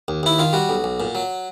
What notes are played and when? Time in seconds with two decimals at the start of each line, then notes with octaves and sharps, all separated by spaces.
0.08 D#2
0.23 D#2 E4
0.39 D#3 F4
0.53 G3 F#4
0.69 B1
0.84 B1
1.00 A#2
1.15 F#3